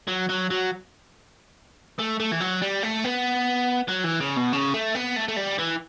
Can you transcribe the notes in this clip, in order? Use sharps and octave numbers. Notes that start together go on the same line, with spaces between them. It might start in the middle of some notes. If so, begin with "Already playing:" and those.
F#3
F#3
F#3
A3
A3
E3
F#3
G3
A3
B3
F#3
E3
C#3
B2
C#3
A3
B3
A3
A3
G3
E3